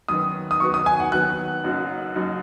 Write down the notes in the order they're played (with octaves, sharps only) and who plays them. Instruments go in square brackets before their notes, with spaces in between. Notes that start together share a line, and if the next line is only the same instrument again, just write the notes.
[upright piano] F#2 D#3 B3 [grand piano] D#6
[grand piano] D#6
[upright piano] D#3 F#3 B3 F#4 [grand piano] C#6
[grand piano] D#6
G#5
F#5
[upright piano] D#3 F#3 B3 F#4 [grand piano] F#6
[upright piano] F#1 F#2 F#3 D#4 F#4
F#1 F#2 F#3 D#4 F#4